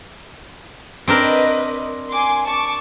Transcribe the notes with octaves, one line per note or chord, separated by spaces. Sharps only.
C4 D4 A#4 B4 D#5
G#5 C6 D6
A5 C#6 D6